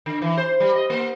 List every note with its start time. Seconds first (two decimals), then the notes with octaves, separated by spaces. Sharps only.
0.06 D3
0.22 E3
0.37 C5
0.60 G3
0.75 D#5
0.90 A#3